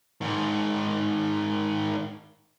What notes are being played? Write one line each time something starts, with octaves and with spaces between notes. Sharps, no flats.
G#2 D#3